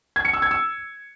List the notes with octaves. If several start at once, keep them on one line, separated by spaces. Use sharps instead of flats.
G#6
C#7
E6
G#6
E6